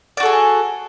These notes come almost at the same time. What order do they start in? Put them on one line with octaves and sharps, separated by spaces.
D5 F#4 A4 G#4